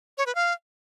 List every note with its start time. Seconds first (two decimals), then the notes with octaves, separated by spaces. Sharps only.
0.18 C#5
0.26 B4
0.35 F5